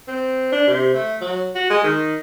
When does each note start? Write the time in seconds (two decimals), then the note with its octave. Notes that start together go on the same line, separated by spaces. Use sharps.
0.08 C4
0.52 D4
0.67 C3
0.95 A3
1.21 F#3
1.55 F#4
1.70 G#3
1.84 D#3